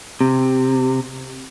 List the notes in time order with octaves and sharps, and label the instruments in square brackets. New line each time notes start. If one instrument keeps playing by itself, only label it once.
[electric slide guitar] C3